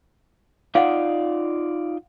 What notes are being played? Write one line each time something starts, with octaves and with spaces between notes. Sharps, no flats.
D#4 F4 D5 F5 F#5